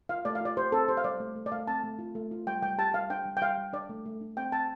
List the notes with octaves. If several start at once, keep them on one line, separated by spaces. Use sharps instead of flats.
F4 F5
A3 D5
F5
F4 D5
G4 C5
C4 A4
G4 C5
F5
G3 D5
A3
A3
D5
A3 F5
C4 A5
A3
F4
A3
F4
G3 G5
G3 G5
G4 A5
G3 F5
D4 G5
G3
G5
G3 F5
G3
D4 D5
A3
A3
D4
C4 G5
C4 A5